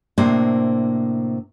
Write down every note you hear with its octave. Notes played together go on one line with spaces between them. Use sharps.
A2 C3 A#3 D4 C5